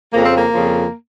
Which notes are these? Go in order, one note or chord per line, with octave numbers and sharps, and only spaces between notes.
F2 C#3 F3 A#3
C4
A#3
F2 C#3 F3